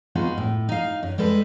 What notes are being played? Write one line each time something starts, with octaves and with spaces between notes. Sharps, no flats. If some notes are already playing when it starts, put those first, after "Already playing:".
B3 D#4 F4 F#4 G#4
A2
D#4 F5
F#2
G3 G#3 A4 B4